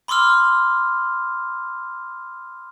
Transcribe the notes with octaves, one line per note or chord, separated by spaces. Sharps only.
B5 C6 D6 E6 F6